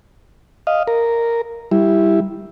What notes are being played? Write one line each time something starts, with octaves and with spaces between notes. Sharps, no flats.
D#5 F5
A#4
G3 E4